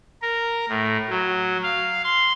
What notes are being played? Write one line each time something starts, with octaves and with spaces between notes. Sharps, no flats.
A#4
A2
F#3
F5
C6